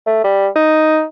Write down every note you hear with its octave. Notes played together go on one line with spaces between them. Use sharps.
A3
G3
D#4